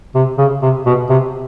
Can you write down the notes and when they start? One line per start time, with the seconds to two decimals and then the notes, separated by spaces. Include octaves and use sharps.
0.15 C3
0.38 C#3
0.62 C3
0.86 B2
1.09 C3